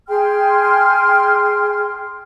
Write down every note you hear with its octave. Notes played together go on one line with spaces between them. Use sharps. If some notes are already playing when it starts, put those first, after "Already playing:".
G#4 G5 C6 F6